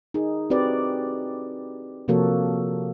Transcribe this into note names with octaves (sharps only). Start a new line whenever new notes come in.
D#4 G#4 A#4
C4 F#4 G4 B4 D5
C3 F3 A#3 F#4 A4 C#5